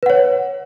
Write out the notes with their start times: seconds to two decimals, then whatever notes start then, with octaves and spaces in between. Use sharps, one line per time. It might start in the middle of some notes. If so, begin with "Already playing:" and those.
0.03 B4
0.06 F#5
0.10 C#5